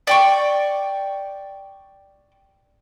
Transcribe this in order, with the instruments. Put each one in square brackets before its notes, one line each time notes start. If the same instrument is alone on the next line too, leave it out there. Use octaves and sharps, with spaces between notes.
[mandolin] D5 G5 C#6